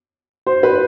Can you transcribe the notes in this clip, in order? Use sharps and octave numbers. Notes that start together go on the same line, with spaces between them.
C5
B4